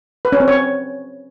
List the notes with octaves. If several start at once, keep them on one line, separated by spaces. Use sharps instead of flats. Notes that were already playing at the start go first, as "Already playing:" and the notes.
B4
C#4
C4
C#5